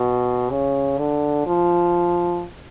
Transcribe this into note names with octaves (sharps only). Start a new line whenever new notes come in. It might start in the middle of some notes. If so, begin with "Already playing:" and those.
Already playing: B2
C#3
D3
F3